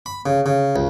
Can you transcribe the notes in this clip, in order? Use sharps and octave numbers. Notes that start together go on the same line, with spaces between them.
B5
C#3
C#3
C#2